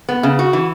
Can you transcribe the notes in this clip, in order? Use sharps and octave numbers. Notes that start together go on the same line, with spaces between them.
B3
C#3
F#4
E3